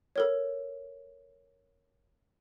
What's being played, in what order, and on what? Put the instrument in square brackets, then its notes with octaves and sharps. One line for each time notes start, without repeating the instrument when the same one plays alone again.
[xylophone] A4 A#4 C#5